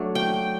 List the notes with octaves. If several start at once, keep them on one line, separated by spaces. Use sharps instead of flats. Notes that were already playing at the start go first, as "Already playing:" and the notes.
Already playing: F#3 A3 D4
G5